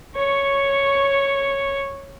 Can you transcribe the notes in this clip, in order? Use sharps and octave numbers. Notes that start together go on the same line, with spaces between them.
C#5 C#6